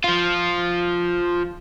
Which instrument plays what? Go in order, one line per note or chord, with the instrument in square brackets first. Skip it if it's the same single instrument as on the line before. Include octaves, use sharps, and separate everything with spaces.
[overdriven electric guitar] F3 F4